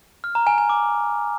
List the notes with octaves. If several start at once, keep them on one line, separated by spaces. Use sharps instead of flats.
F6
A#5
G#5
G#5
D6